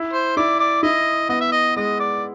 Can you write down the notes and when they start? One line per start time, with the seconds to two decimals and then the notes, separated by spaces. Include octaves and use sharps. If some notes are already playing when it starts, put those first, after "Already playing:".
Already playing: E4
0.13 C5
0.37 E4 D5
0.59 D5
0.83 E4 D#5
1.29 B3 D#5
1.41 E5
1.52 D#5
1.76 G#3 D#5
2.00 D5